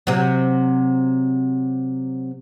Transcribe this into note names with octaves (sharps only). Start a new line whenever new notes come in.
C3 F#3